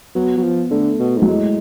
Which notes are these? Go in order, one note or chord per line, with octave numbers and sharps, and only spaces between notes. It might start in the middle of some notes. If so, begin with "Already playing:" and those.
F#3 B3
F#3
F3
D3 A3
B2
G#2 F#3
A2 G#3